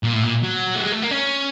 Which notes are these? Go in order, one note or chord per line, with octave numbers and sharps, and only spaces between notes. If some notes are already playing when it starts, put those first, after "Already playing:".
A#2
A2
A#2
F#3
A3
G#3
A3
A#3
C#4